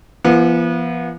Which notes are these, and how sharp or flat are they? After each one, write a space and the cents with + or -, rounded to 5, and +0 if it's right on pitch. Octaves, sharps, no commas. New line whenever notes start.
F3 -45 B3 -30